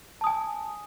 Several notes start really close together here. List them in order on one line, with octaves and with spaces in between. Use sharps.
A5 D#6 G#5